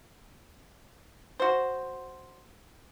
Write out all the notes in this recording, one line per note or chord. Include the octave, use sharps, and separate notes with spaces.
F#4 C5